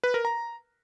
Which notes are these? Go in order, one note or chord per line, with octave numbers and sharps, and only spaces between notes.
B4
A#4
A#5